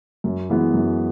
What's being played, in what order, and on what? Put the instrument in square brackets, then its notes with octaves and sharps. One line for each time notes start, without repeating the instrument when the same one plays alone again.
[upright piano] F#2
E3 G#3 B3
F#2